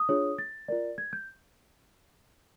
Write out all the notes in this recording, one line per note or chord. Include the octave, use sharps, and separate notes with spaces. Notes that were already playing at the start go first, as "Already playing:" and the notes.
Already playing: D#6
D4 F4 G#4 C#5
A6
F4 A#4 D5
G#6
G6